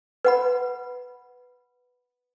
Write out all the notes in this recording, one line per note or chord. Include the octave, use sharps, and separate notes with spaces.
B4 F#5 B5